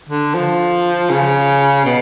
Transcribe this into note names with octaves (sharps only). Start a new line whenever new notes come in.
D3
F3
C#3
B2